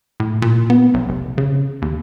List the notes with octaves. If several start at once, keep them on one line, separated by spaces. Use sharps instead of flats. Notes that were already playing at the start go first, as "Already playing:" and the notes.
A2
A#2
B3
B1
F1
C#3
D#2